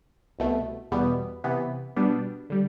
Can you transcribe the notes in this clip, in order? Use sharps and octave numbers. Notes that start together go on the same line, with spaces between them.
C2 B2 A3
E2 B2 G3 B3
C3 E3 B3
B2 G3 B3 D4
D3 G3